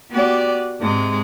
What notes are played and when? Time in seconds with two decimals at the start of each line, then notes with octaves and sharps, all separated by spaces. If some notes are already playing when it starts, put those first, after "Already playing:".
0.11 B3 F#4 G4 D5
0.79 G#2 C3 G#3